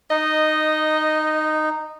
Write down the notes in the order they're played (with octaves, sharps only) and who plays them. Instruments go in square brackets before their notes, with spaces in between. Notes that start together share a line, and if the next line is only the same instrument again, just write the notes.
[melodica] D#4 [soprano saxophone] D#5